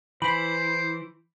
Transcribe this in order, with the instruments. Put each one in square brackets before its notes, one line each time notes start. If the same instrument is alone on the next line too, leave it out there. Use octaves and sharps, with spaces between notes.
[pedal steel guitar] E3 [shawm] C5 [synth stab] B5